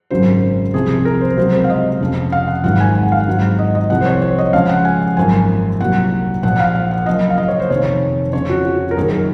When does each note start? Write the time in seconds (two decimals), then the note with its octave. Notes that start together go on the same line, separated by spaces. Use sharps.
0.11 G#1 F#2 C#3 F#3 C5
0.74 C2 C3 F3 G#4
0.90 G#4
1.05 A#4
1.21 C5
1.37 C#2 C3 F#3 C5
1.53 C5
1.64 F5
1.70 D#5
2.00 F1 F2 C#3 F3
2.32 F5
2.48 F#5
2.64 G#1 G#2 D#3 F#3 F#5
2.80 G#5
2.95 G#5
3.03 F#5
3.12 F5
3.20 F#5
3.27 G#1 G#2 D#3 F#3
3.59 D#5
3.75 D#5
3.90 C2 C3 F3 F#5
4.01 C5
4.06 C#5
4.22 C#5
4.38 D#5
4.53 C#2 C#3 F3 F5
4.69 F#5
4.85 G#5
5.01 F#5
5.17 G#1 F#2 F3 G#5
5.80 C2 A#2 F#3 F#5
6.43 A#1 A#2 F3 F#5
6.60 F5
6.75 F5
6.91 F#5
7.06 F#1 F#2 F3 D#5
7.30 F5
7.38 D#5
7.48 C#5
7.59 C5
7.70 F1 F2 D#3 C#5
8.33 F2 C#3 F3 C#5
8.49 F#4
8.65 F#4
8.91 A#4
8.97 F#1 F#2 D#3 F#3 G#4